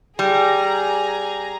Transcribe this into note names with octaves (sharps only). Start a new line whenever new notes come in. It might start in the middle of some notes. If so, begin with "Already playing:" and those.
G3 G#4 A#5